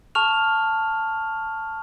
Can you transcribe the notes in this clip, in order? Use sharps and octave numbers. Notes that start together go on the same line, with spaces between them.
A5 C#6 F6 F7